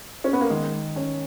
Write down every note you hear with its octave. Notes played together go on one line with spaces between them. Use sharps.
C#4
B3
A#3
D#3 G#3
C#4